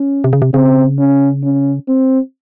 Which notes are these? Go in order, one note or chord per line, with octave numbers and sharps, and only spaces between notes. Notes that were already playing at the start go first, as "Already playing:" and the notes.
Already playing: C#4
C3
C#3
C3
C#3 C4
C#4
C#4
C4